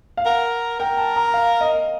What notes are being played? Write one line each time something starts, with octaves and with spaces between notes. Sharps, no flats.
F5
A#4 F#5
A#4 G5
A5
A#5
F5
D#5